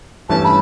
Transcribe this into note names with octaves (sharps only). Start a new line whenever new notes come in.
G2 E3 A3 C#4 A5
B5